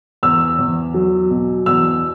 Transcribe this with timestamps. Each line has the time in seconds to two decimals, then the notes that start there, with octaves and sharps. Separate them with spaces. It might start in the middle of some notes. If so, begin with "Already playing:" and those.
0.23 E2 E6
0.59 E2
0.94 F#3
1.30 B2
1.66 E2 E6